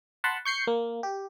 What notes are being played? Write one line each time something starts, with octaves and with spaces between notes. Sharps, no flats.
F#5 A5 B5 C6
C#6 G6 C7 C#7
A#3
G4